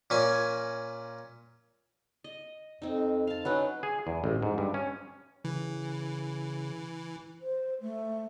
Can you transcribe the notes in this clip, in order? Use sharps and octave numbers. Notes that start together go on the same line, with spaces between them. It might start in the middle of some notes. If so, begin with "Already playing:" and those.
A#2 C#4 G#5
D#5
F2 C4 D#4
F5 A5
F#3 C#4 D#4 B4
G#4
E2
A1
G#2
G2
C#4
C#3 E3
C5
A3